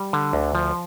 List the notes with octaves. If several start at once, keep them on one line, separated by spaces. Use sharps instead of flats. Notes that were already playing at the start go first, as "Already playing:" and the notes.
Already playing: G3
D3
D2
F3